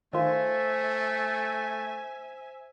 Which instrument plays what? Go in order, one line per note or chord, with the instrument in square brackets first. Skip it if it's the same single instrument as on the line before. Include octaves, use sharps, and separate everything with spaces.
[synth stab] D#3 F4 [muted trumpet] A3 [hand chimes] C5 [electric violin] E5 G#5